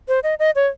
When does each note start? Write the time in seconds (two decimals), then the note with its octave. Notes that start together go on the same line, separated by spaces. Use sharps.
0.08 C5
0.23 D#5
0.39 D#5
0.56 C#5